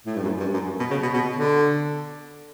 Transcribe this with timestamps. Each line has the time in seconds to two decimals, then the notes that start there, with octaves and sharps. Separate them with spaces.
0.06 A2
0.16 G2
0.24 F#2
0.40 G2
0.54 F#2
0.80 B2
0.91 C#3
1.03 B2
1.13 B2
1.36 D3